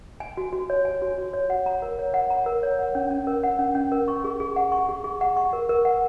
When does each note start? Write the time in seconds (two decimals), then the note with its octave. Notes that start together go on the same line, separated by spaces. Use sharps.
0.20 G#5
0.37 F#4
0.53 F#4
0.70 C#5
0.85 G#5
1.02 F#4
1.18 F#4
1.34 C#5
1.50 F#5
1.66 A#5
1.82 A#4
1.99 C#5
2.14 F#5
2.30 A#5
2.46 A#4
2.63 C#5
2.79 F#5
2.95 C#4
3.11 C#4
3.27 A#4
3.43 F#5
3.59 C#4
3.75 C#4
3.92 A#4
4.08 C#6
4.24 G#4
4.40 G#4
4.56 F#5
4.72 C#6
4.89 G#4
5.04 G#4
5.21 F#5
5.37 C#6
5.53 A#4
5.69 A#4
5.85 F#5